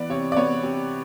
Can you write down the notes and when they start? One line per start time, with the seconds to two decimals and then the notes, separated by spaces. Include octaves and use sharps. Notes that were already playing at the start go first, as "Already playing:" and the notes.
Already playing: E3 B3 D5
0.09 C3 C#5
0.32 D5
0.36 B3 C#5
0.63 C3